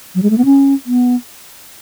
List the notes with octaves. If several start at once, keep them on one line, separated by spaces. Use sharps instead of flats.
F#3
G#3
A3
B3
C#4
B3